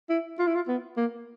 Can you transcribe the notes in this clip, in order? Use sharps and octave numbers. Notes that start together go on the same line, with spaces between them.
E4
F4
E4
F4
B3
A#3